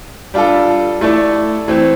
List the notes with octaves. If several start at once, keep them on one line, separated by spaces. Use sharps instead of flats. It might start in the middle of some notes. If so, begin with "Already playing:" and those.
G3 D4 F4 A4
A3 E4 A4 D5
E3 A3 C4